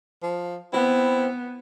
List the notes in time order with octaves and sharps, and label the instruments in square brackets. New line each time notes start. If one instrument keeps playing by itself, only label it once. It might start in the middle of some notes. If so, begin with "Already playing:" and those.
[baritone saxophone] F3
[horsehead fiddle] B3 [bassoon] C4 [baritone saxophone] E4